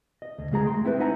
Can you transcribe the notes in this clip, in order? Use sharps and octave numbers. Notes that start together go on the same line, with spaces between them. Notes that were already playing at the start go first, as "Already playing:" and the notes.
D#5
D2
C#3 G#3 G#4 A#5
A3 G5 C6
C4 E4 G4 G#4 B4 C5
D#4 C5 E5 F#5 G#5 A#5